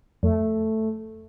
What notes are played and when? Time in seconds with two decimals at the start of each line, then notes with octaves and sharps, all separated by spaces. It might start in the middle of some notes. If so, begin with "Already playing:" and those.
0.23 F2 A3